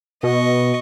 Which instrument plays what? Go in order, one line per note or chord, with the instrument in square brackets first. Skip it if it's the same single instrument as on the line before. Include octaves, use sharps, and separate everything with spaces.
[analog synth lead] B2 [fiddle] D#5 C#6